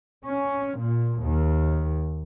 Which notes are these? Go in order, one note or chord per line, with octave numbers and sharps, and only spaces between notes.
C#4
A#2
D#2